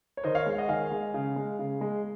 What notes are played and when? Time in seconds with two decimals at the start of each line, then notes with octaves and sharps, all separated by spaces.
0.17 C#5
0.24 D#3 C5 D#5
0.35 C#5 F5
0.46 G#3
0.58 D#5 F#5
0.68 D#3 F5 G#5
0.91 G#3
1.14 C#3
1.36 G#3
1.59 C#3
1.81 G#3